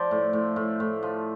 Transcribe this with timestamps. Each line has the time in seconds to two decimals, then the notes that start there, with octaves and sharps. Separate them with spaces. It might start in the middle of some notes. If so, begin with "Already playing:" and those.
Already playing: F3 C5 D5
0.11 A2
0.33 A2
0.56 A2
0.80 A2
1.03 F3